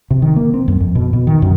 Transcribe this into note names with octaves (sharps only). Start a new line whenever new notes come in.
C3
D#3
A#3
C4
F#2
F2
B2
B2
D#3
F#2